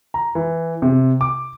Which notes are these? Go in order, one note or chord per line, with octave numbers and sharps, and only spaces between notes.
A#5
E3
C3
D6